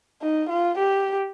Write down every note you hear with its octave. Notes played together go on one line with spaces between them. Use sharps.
D#4
F4
G4